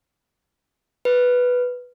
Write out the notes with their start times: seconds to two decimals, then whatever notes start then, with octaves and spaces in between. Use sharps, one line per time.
1.05 B4